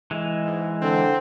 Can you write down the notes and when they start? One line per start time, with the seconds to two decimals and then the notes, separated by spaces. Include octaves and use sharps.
0.11 E3 G#3
0.45 G#2
0.82 D3 C4